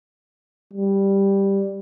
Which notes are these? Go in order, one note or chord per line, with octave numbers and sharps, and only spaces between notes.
G3